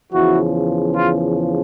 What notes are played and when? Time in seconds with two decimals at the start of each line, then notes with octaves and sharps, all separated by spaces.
0.13 E2 C#3 F3 E4 F#4
0.95 F4